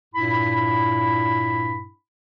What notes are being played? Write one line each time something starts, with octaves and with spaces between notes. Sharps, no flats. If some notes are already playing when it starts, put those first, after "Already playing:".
G2 A#2 E4 B5